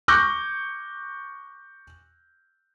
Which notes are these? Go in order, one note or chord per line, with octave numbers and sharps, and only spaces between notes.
C#6 D6 F#6 G6 A#6